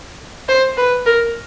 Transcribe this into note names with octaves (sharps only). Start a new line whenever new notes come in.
C5
B4
A#4